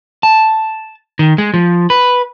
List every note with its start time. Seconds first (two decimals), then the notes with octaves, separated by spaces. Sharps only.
0.23 A5
1.19 D#3
1.38 G#3
1.54 F3
1.90 B4